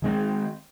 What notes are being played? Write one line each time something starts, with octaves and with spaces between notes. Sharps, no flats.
D#3 G#3 C4